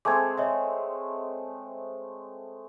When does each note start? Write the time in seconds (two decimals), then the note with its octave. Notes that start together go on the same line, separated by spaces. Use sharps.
0.05 G#3 A3 C4 D6 G#6
0.38 C#5 D#5 E5